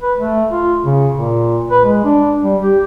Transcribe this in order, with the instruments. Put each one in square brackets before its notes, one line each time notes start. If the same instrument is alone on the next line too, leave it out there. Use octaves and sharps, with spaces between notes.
[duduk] B4
A3
F4
C#3
A#2
B4
G#3
D4
G3
G4